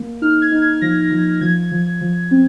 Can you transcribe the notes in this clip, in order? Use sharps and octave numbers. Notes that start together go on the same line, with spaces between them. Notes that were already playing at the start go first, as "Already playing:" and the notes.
Already playing: A#3
D#4 F6
G#6
D#4
G#6
F3 A#6
F3
F3 G#6
F3
F3
C4